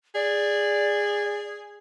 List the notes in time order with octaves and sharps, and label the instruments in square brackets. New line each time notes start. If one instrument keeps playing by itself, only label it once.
[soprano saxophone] G#4 [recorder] D5